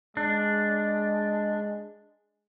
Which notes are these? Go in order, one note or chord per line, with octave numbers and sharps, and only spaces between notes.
G#3 D4